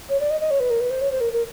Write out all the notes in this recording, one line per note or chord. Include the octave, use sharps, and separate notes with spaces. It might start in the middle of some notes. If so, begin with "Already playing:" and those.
C#5
D5
D#5
D#5
C#5
B4
A#4
B4
C5
C#5
C5
A#4
A#4